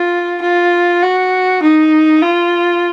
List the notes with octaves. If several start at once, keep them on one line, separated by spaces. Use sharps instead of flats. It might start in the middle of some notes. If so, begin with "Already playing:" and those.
Already playing: F4
F4
F#4
D#4
F4